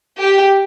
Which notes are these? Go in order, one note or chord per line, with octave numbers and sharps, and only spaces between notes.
G4